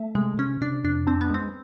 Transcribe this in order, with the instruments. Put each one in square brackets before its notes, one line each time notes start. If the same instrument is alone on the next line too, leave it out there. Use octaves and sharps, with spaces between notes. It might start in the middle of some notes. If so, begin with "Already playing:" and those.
Already playing: [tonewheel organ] A3
[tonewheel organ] C3 [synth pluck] G#3
[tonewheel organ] C3 [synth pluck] C#4
[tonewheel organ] C3 [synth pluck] D4
[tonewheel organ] F2 [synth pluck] D4
[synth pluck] C4 [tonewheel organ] D4
[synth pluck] B3
[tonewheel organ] G#3 [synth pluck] C4